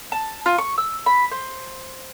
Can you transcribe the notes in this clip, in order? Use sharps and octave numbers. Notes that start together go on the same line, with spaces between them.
A5
F4
C#6
E6
B5
C5